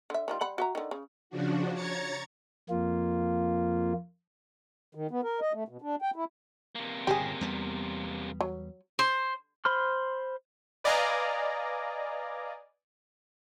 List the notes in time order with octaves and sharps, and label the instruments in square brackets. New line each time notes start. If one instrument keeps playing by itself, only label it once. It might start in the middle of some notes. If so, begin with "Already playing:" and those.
[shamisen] D3 E5
D#3 G3 F4
G3 F#5 B5
F#4 E5 A#5
D3 D#3
C#3
[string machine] C#3 F3 D4 F#4
C#5 A#5 G#6 A6 C#7
[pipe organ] F2 A#3 F4
[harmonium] D#3
B3
A#4
D#5
A3
B2
D4
G5
E4
[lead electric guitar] C3 A#3
[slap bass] G1 A#2 C#3 [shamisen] G4 G#4
[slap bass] E2 G3 B3
[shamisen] F#3
[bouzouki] C5
[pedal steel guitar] C5 B5 C6 F6
[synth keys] B4 D5 D#5 F5 G#5 A#5